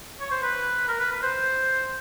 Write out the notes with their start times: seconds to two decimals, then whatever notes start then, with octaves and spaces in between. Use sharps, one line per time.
0.20 C#5
0.31 C5
0.43 B4
0.88 A#4
1.00 B4
1.12 B4
1.23 C5